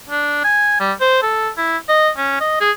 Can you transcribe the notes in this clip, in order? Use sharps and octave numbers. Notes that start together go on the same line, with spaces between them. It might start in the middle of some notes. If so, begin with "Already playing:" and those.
D4
G#5
G3
C5
A4
E4
D#5
C#4
D#5
G#4